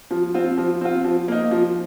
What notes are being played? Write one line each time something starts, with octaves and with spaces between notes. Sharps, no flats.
F3
C4 F4
F3
C4 F4
F3
A#3 D#4
F3